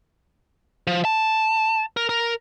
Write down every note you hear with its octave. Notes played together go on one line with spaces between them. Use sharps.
F3
A5
A#4
A#4